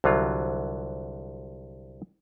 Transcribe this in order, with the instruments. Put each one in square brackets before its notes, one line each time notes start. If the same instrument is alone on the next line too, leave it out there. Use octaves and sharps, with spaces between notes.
[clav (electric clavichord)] C2 D3 F#3 F4